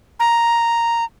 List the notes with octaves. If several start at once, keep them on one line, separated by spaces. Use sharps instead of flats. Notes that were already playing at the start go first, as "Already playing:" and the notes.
A#5